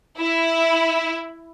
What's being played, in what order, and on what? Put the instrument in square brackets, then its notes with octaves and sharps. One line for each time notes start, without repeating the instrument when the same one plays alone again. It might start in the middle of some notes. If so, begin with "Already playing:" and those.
[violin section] E4